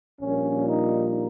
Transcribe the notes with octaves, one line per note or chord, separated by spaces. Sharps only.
A#1 A#2 G3 C#4
D#4